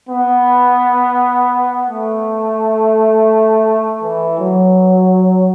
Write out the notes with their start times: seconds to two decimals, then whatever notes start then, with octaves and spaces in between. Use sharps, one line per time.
0.09 B3
1.88 A3
4.04 E3
4.39 F#3